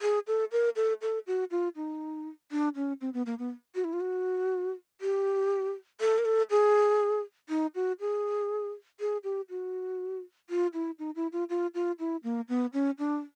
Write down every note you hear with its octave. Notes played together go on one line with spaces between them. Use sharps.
G#4
A4
A#4
A4
A4
F#4
F4
D#4
D4
C#4
C4
B3
A#3
B3
F#4
E4
F4
F#4
G4
A4
A#4
A4
G#4
D#4
F#4
G#4
G#4
G4
F#4
F4
E4
D#4
E4
F4
F4
F4
E4
A#3
B3
C#4
D4